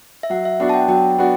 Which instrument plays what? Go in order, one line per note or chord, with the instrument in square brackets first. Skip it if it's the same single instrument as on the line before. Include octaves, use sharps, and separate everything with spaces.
[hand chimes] E5
[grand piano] F#3 [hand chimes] F#5
[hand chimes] E5
[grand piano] B3 D4 F#4 [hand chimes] F#5
[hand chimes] A5
G5
[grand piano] F#3 [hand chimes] G5
[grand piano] B3 D4 F#4